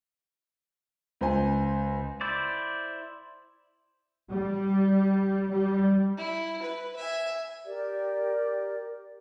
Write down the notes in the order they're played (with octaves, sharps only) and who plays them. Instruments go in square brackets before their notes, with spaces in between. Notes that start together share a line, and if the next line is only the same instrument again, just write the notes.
[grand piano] C#2 C5 G#5
[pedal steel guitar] E4 C5 D5
[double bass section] G3
G3
[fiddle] E4
B4
E5 G#5
[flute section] G4 A#4 D5